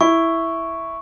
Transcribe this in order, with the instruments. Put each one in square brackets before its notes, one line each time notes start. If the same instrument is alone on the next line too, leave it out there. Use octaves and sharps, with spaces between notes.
[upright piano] E4 [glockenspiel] C#6